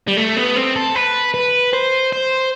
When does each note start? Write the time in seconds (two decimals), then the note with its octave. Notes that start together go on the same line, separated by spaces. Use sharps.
0.07 G3
0.17 A3
0.36 B3
0.56 C4
0.76 A4
0.95 B4
1.34 B4
1.73 C5
2.12 C5